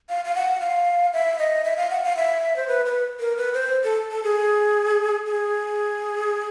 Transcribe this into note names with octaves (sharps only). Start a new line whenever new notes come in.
F5
F5
F#5
F5
E5
D#5
E5
F5
F#5
F5
E5
C5
B4
B4
A#4
B4
C5
A4
A4
G#4
G#4